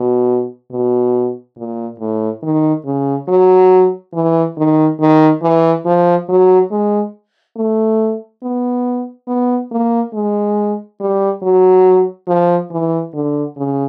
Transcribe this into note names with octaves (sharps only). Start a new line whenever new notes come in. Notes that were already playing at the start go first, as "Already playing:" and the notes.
Already playing: B2
B2
A#2
A2
D#3
C#3
F#3
E3
D#3
D#3
E3
F3
F#3
G#3
A3
B3
B3
A#3
G#3
G3
F#3
F3
E3
D3
C#3